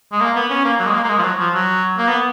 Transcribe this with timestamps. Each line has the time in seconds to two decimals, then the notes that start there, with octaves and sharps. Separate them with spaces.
0.12 G#3
0.20 A#3
0.35 B3
0.50 C#4
0.64 A#3
0.79 F#3
0.86 G#3
0.94 A#3
1.04 A#3
1.09 G#3
1.18 F3
1.23 F#3
1.38 F3
1.54 F#3
1.98 A#3
2.08 B3